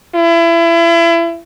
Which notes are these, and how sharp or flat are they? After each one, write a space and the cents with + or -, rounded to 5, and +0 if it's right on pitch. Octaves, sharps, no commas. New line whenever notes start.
E4 +30